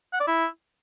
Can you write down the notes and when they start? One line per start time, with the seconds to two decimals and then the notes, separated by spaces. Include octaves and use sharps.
0.13 F#5
0.20 D5
0.27 E4